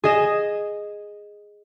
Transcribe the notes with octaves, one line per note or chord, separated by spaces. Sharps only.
G#4 D#5 E7